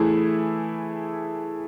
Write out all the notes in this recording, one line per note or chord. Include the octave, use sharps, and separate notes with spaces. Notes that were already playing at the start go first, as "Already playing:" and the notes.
Already playing: E3 A3 E4 G#4